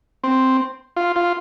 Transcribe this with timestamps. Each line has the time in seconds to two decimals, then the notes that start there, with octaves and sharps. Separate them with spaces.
0.24 C4
0.96 F4
1.16 F4